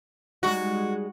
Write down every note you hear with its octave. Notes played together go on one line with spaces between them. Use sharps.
G3 G#3 D#4 F#4